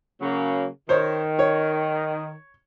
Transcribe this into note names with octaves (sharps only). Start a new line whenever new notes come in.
C#3 F#3 A#3
D#3 C5 C#5
C#5